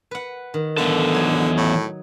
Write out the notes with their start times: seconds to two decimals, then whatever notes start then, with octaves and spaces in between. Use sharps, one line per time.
0.11 B4 F#5
0.54 D#3
0.77 D3 E3 B3 A4
1.15 F#3 D#4
1.57 A2